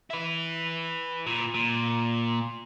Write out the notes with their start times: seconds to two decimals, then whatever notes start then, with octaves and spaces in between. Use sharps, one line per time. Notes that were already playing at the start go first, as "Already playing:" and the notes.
0.10 E4 B4
1.26 A#2
1.54 A#2